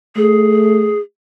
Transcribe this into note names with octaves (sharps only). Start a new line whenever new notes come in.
A3 G#4